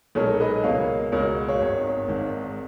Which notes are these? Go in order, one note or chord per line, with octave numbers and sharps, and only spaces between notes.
B1 A#2 G#3 A#4 C#5
B4 D#5
C#2 B2 A#3 C#5 F5
C#2 B2 A#3 A#4 C#5
F#4
F#4
C#5 F5
G#1 G#2 D#3
G#1 G#2 D#3